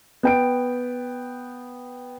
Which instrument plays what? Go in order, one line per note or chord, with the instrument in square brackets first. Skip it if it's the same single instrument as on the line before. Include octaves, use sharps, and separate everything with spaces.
[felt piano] B3 G5 D7